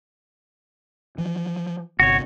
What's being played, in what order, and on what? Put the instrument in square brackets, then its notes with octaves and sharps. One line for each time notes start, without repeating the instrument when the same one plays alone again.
[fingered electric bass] E3 F3
[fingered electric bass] G1 C3 [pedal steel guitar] F#4 C#5